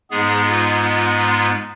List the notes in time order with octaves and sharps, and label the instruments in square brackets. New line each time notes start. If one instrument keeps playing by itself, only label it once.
[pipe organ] G#2 G#3 B3 G#4
F4
F4
F4